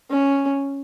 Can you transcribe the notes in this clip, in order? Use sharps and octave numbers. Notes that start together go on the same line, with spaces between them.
C#4